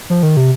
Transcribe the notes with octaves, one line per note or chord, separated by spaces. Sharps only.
F3
D#3
C3